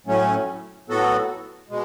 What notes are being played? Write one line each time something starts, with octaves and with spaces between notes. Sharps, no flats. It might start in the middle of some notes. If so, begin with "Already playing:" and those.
A2 F#3 A3 C#4
A2 F#3 B3 F#4 A4
B2 G#3